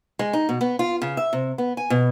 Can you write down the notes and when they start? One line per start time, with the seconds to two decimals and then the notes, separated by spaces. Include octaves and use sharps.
0.19 G#3
0.33 D#4
0.49 B2
0.61 B3
0.79 F4
1.02 C#3
1.17 E5
1.33 C3
1.58 B3
1.77 G#5
1.90 B2